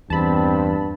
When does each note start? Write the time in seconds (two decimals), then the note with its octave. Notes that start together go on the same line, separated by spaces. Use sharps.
0.10 E2 G2 C4 A5 B5